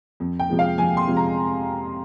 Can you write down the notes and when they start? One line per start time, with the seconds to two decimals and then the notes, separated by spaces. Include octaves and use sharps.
0.20 F2
0.39 G5
0.49 C3 F3 G#3
0.59 F5
0.78 F2 G#5
0.97 C6
1.07 C3 F3 G#3
1.17 A#5